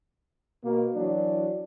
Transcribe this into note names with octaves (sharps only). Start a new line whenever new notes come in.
B2 A#3
E3 F#3 D4